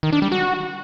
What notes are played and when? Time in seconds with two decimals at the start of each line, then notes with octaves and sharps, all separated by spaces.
0.03 D#3
0.13 D4
0.22 G3
0.32 F#4